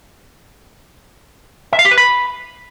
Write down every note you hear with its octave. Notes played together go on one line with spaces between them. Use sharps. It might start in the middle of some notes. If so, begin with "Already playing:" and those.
E5
F5
G4
B4
B5